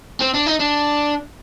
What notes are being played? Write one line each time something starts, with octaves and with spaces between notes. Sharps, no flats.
C4
D4
D#4
D4